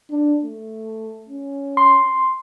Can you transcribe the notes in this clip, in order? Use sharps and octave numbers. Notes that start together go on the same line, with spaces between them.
D4
A3
C#4
C6